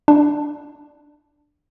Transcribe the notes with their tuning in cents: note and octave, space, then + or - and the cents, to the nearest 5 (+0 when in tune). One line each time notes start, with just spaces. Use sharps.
D4 +10